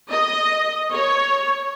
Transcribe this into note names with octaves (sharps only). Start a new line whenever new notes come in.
D#5
C#5